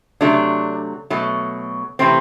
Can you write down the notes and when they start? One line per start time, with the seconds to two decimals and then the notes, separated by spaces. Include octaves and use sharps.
0.21 C3 F#3 A3 D4
1.10 B2 F#3 A3
1.99 C3 E3 A3 C4